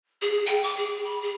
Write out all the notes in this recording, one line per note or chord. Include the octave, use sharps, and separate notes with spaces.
G#4
G5
D6
G#4
B5
G#4